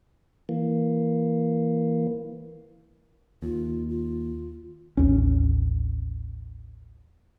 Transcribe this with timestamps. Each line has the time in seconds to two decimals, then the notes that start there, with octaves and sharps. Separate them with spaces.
0.49 E3 A#3
3.42 D#2 F4
3.89 F4
4.97 A1 D#2 C#4